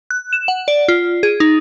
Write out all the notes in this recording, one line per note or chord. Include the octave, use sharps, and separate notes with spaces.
F#6
E7
F#5
D5
F4
G#4
D#4